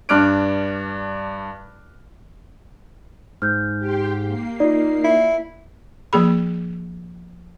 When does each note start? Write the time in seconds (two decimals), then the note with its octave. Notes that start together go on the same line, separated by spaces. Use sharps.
0.09 G2 D4 D6 F6 F#6 D7
3.42 G#2 F6 G6
3.79 G4 G5 C6
4.23 A#3 C7
4.60 D#4 F4 D5
5.04 E4
6.13 F3 A#3 G#4 B5